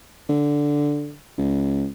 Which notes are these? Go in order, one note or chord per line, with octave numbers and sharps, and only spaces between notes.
D3
C#2